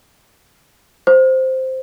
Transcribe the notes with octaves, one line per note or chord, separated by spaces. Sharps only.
C5